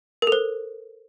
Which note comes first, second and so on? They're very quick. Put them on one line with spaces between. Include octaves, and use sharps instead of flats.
A#4 A4 C5